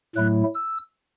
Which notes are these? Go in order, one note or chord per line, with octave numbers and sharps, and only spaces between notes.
A2 F#3 A3 E4 F#6
E6